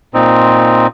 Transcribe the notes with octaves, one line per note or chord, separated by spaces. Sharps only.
A#2 C4 D#4